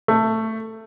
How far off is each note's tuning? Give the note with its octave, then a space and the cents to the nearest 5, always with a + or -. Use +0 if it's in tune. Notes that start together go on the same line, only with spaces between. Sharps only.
A3 +15